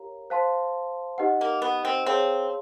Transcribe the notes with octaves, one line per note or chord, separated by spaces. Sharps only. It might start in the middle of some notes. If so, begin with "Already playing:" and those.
Already playing: G4 A#4 C#5 F5 A#5
C5 F5 A5 C6
D#4 G4 B4 D#5 F#5
A#3
B3
C4
C4 G#4 C#5 F5 A5 C6